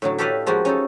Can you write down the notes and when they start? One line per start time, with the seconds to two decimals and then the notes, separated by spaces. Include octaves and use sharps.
0.02 A2 D3 F#3
0.18 G4 A4 B4 D5 D#5 F5
0.47 F3 G#3 A#3 F#4 G4
0.65 C#4 D#4 A4